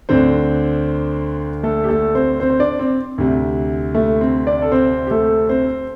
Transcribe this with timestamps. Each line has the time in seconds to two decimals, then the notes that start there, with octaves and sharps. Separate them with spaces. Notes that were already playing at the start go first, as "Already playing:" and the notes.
0.09 D2 D3 C4 C5
1.63 A3 A4
1.84 G4
1.89 A3 A4
2.15 C4 C5
2.40 C4 C5
2.50 C5
2.59 D4 D5
2.79 C4
3.18 D2 C3
3.94 A3
4.21 C4
4.46 D4 D5
4.62 A4
4.72 C4 C5
5.07 G4
5.11 A3 A4
5.49 C4 C5